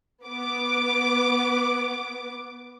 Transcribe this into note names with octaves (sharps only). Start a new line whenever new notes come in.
B3 D6